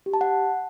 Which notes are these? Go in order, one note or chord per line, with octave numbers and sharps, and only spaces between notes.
G4
A5
F#5